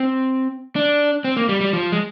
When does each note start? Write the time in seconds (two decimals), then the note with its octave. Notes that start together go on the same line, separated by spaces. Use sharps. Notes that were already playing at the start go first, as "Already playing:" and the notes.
Already playing: C4
0.76 D4
1.24 C4
1.37 A#3
1.49 G3
1.61 G3
1.73 F3
1.92 G#3